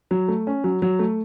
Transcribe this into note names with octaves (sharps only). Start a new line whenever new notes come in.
F#3
A3
C#4
F#3
F#3
A3